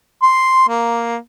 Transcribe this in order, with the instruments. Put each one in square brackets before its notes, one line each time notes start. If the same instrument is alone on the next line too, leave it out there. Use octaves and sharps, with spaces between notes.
[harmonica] C6
A#3